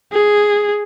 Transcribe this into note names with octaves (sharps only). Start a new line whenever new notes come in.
G#4